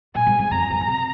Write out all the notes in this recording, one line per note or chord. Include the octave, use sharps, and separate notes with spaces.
A#2 G#5
G#2
G#2
F2 A#5
G#2
D#3
C3